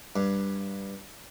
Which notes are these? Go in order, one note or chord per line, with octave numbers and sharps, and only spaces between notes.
G2